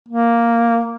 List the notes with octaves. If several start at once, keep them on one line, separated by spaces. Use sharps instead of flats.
A#3